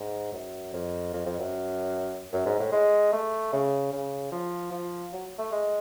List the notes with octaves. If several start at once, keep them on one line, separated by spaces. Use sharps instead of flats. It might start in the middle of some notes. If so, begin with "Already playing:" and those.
Already playing: G#2
F#2
F2
F2
F2
F#2
F#2
G#2
A2
G#3
A3
C#3
C#3
F3
F3
F#3
A3
G#3